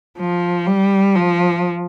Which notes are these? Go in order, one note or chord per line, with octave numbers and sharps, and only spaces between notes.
F3
G3
F3